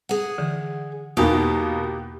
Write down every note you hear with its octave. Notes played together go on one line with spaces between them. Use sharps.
G#4 F#5
D3 E3
E2 B2 A#3 B3 D#4 G4 D#6